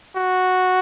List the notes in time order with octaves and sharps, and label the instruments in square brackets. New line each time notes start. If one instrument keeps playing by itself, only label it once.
[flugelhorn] F#4